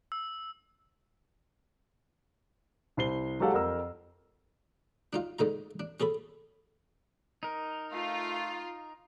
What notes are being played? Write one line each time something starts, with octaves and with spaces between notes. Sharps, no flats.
E6
C2 C5 C7 G7
F#3 G#3 G4 A4 F5 F#5
F2 A#4 E6
D4 D#4 F4
G#2 D3 D#4 A#5
D4
C#4 G#4 A4 B5
D#4 A#4
A3 F4